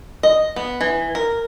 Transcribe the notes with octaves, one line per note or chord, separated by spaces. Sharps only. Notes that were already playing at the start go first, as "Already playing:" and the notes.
D#5
B3
E3
A#4